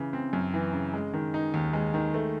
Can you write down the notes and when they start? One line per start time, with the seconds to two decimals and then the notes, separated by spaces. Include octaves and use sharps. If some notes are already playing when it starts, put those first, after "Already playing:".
Already playing: C#3 E3
0.13 C4
0.33 F#2
0.54 E3
0.73 C#3
0.93 G#3
1.13 D#3
1.34 D#4
1.54 D#2
1.73 G#3
1.94 D#3
2.14 A3